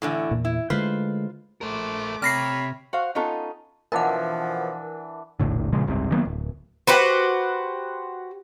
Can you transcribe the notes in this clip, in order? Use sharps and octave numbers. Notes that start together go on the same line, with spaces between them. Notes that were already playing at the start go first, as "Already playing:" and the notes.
A2 D3 E3
E2 A#2
E4
D3 G#3 A3 F4 B4 C5
A3 A#4 C5 D6
C3 C#5 B5 F6 A#6 C7
F#4 C5 F5
B3 C#4 D#4 F4 A4
B2 E3 F3 D4 A#4 F#5
E1 A#1 A2 D3
A#2 C#3 F3 G#3
F#1 C2 G#2 C3
D#3 F#3 A#3 B3
D1
F#4 G4 B4 C5